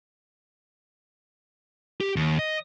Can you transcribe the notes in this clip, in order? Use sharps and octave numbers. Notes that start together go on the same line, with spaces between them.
G4
D#2
D#5